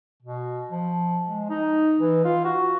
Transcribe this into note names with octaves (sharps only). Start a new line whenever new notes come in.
B2
F3
G#3
D#4
E3
F4
F#4